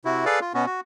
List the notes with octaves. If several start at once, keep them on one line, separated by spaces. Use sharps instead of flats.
C3 E4 F#4
G#4 A4 B4 D5 F5
F4
B2 B3 C#4 F#4
F#4